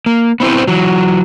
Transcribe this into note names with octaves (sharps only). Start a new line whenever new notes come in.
A#3
B3 C4 E4 C5
E3 F#3